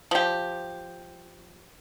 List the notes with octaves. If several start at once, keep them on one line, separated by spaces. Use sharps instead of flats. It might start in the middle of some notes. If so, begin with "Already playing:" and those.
F3 G4